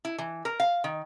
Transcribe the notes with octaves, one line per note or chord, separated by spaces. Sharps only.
E4
E3
A#4
F5
D#3